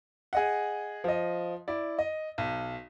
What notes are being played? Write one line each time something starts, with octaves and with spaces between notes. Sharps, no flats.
G#4 D#5 F#5
F3 D#5
E4 D5
D#5
B1